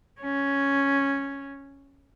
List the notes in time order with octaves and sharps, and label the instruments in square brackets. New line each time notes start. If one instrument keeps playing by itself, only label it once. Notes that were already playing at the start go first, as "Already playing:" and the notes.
[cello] C#4